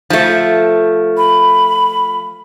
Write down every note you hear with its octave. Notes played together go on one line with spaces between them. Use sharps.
F3 A3
B5